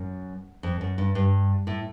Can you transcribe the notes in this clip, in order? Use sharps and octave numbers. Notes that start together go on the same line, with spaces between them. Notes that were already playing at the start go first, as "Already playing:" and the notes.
Already playing: F#2
F2
F#2
G2
G2
A2